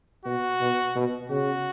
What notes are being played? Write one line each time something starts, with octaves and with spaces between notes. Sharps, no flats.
B2 F#4
B2
B2
C#3 F#4